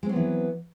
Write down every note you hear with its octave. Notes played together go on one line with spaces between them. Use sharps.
E3 F#3 G#3 B3 C4